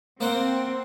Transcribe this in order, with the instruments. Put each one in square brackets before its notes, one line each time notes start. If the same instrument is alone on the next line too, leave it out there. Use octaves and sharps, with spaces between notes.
[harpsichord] A#3 C5 F#5 [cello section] C4